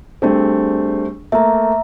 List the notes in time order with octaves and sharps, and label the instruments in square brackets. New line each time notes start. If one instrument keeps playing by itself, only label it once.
[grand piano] G3 A3 C4 [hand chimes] D4 G#4
[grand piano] A3 A#3 [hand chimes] E5 A#5